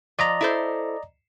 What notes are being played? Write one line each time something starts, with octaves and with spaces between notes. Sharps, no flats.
F3 D5 D#5 A#5
E4 A4 C5